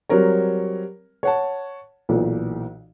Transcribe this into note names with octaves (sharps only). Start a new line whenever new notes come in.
F#3 G3 C4 A#4 C#5
C#5 F#5 A5
B1 A#2 E3